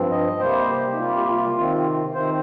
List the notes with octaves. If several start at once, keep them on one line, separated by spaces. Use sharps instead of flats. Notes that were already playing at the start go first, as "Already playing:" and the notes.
Already playing: G2 F3 C4
D#5
C3 G3 A#3 C5
G4
D#4
C3 G3 A#3 F4
G4
F4
C3 D#3 C4 F4
C3 D#3 C4 C5